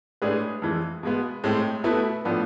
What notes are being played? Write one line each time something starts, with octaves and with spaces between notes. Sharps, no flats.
A2 G#3 D4 G#4 B4
F2 E3 G#3
B2 G#3 B3
A2 G#3 C4
B2 A3 E4 B4
A2 F3 B3 D4